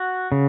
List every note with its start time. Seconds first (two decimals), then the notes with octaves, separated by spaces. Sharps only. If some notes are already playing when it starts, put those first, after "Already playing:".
Already playing: F#4 F#5
0.32 C#3